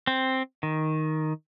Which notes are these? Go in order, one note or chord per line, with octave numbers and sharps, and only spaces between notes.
C4
D#3